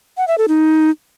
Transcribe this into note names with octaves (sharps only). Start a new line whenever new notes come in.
F#5
E5
A4
D#4